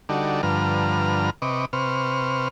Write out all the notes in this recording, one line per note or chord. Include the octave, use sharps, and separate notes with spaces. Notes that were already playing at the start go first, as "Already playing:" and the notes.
D3 G3 D#4 F#4 A4 D5
G2 D3 F3 B4 A#5 F6
C3 B4 D#5 C#6 D6
C3 B4 C5 C#6 F6